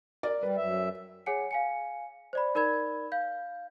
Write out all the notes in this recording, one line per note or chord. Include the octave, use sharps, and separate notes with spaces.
A#4 D5
G3 B4
F#2 E5
G#4 C#5 F#5 G#5 C#7
F5 G#5 C#7
C5 D5 B5
D#4 A#4 D5 B5 G#6
F5 G6